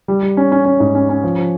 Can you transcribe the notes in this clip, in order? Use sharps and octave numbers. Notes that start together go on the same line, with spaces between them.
G3
G3
C#4
C#4
C#4
G#2
C#4
C#4
F3
F3